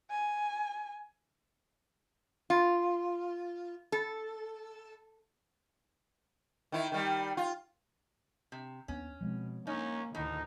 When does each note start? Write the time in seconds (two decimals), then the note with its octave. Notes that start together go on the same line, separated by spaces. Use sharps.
0.10 G#5
2.50 F4
3.92 A4
6.72 D#3 E4
6.92 D#3 G3
7.37 F4
8.52 C3
8.88 D#2 B3 C#4
9.21 B2 F3 G#3 C4
9.67 A#3 C#4 D#4
10.15 D2 A2 D#3 D#4